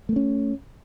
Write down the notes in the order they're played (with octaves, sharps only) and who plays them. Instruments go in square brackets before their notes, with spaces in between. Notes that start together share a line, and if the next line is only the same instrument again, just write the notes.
[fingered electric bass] A3
A#3
C#4